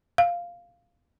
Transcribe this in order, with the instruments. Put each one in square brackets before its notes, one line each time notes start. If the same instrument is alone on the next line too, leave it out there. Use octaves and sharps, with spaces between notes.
[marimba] F5